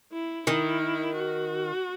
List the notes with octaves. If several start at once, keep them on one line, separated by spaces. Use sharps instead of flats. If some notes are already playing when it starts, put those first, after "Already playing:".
E4
D#3 E4
F#4